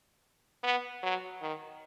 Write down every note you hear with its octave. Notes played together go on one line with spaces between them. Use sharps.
B3
F#3
D#3